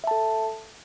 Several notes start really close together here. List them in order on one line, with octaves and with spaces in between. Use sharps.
E5 A5 A4